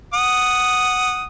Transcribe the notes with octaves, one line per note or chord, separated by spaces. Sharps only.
F#5 D#6